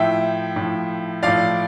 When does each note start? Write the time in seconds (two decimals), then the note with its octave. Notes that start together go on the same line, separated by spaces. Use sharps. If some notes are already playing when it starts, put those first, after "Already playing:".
Already playing: A2 F3 E5 G5
0.56 A2 F3
1.23 A2 F3 D5 F5